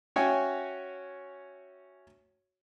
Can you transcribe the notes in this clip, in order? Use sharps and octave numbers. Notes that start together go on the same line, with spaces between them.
C#4 F#4 C#5 E5 G5 G#5